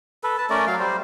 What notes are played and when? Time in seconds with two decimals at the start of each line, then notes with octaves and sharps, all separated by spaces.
0.24 A4 B4
0.38 B4 A5
0.50 A3 C#4 A#4 D5
0.67 F#3 F5
0.79 G3 C5